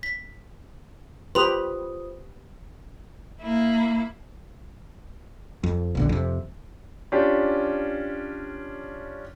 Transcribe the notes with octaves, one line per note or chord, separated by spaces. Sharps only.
B6
F4 G4 B4 C5 C6 D#6 F7
A#3 E4
F2
E1 A#1 D3
F2 C3
C#4 D4 F4 G4